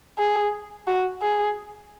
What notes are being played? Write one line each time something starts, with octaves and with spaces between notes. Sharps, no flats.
G#4
F#4
G#4